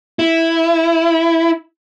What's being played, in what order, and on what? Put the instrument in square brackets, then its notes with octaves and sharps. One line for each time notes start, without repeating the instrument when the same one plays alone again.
[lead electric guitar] E4